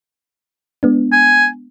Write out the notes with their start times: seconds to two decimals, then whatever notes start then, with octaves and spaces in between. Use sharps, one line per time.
0.83 G#3 B3 D4
1.13 G#5